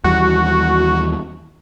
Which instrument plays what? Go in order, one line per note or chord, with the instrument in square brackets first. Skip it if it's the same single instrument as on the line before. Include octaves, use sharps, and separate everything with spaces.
[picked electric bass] D#2 E3 G3 [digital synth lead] F#4